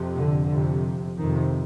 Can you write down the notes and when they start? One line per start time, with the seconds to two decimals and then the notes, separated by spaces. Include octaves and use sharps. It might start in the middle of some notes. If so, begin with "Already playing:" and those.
Already playing: F2 C3
0.15 D3
0.49 F2 C3
1.17 F2 C3 D#3